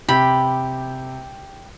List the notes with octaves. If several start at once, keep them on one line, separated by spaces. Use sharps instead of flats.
C3 G4 G5 B5